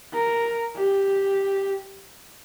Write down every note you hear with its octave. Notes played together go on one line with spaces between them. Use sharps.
A#4
G4